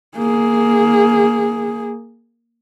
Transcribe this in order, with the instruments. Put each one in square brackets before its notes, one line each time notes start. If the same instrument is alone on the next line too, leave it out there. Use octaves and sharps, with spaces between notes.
[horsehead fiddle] A#3 G#4